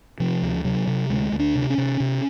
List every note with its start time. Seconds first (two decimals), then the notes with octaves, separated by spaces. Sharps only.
0.20 C3 F3
0.42 D2
0.65 C3 F#3
0.87 C3
1.09 D2 G#3
1.32 D2
1.39 D4
1.55 C3
1.70 C#4
1.78 C3
2.00 C3